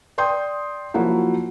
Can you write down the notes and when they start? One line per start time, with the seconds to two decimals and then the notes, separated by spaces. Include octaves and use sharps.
0.18 D5 G5 C6 D#6 G6
0.94 F3 F#3 A#3 E4 F#4